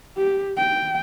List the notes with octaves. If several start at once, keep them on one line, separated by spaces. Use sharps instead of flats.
G4
G5